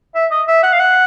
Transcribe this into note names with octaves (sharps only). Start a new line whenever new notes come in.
E5
D#5
E5
F#5
F5
F#5